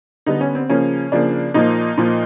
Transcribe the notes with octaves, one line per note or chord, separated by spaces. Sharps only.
D3 G3 B3 D#4
C#4
C4
C#3 F3 A#3 C#4
C#3 F3 A#3 D4
A#2 F3 A#3 D#4
A#2 F3 A#3